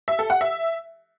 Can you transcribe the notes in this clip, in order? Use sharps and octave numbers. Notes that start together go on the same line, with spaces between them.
E5
A4
F#5
E5